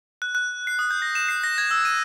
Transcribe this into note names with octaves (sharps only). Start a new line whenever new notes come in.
F#6
F#6
C7
D#6
G6
A#6
E7
C7
A#6
G#6
E6
D#7